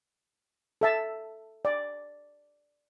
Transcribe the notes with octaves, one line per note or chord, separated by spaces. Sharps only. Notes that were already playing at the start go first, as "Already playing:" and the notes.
A4 E5 A5
D5